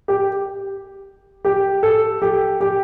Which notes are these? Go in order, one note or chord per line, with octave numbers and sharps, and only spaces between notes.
G4
G4
A4
G4
G4